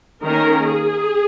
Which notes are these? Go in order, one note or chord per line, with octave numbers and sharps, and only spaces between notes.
D#3 A#3 C#4 A#4
G#4